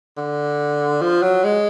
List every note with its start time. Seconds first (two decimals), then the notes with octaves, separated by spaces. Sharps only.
0.17 D3
1.01 F3
1.22 F#3
1.44 G#3